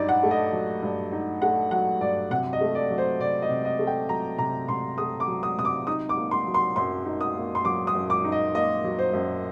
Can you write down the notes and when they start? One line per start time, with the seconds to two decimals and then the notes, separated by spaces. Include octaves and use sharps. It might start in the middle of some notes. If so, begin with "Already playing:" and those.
Already playing: G2 F#3 D#4 D5
0.09 F#5
0.23 A3
0.31 D#5
0.53 F#3
0.83 G2
1.12 D#4
1.42 A3 F#5
1.71 F#3 F#5
2.01 G2 D5
2.31 C3 F#5
2.53 D#5
2.61 A3
2.75 D5
2.91 F#3
2.98 C5
3.19 C3 D5
3.42 D#5
3.49 C3
3.65 D#5
3.79 A3
3.87 G5
4.09 F#3 A#5
4.38 C3 A#5
4.68 C3 C6
4.98 A3 D#6
5.20 D6
5.27 F#3
5.43 D#6
5.58 C3 D#6
5.65 D6
5.87 D#4 D#6
6.09 D6
6.17 A#3
6.31 C6
6.47 F#3
6.54 C6
6.76 F#2 C6
7.05 D#4
7.21 D#6
7.36 A#3
7.55 C6
7.65 F#3 D6
7.87 D#6
7.95 F#2
8.10 D6
8.24 D#4
8.32 D#5
8.54 A#3 D#5
8.84 F#3
8.99 C5
9.13 F#2